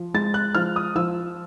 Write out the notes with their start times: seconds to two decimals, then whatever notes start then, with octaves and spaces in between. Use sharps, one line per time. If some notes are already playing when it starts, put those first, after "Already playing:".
Already playing: F3
0.14 G#3 A6
0.34 F#6
0.55 F3 F6
0.76 D#6
0.95 F3 E6